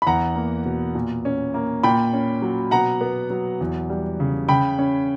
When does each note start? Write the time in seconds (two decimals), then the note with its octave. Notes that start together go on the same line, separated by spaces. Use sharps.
0.02 B5
0.07 E2 F#5 A#5
0.36 A#3
0.65 B2
0.95 A#2
1.25 C#4
1.54 A#3
1.83 A#2 G5 B5
2.13 C#4
2.42 F#3
2.71 B2 F#5 A#5
3.01 B3
3.30 F#3
3.61 E2
3.90 G3
4.20 C#3
4.49 C#3 G5 B5
4.79 C#4